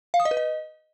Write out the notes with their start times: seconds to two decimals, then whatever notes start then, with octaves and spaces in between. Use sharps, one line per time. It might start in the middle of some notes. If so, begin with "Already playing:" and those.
0.14 F5
0.20 D#6
0.25 D#5
0.31 B4
0.37 D#5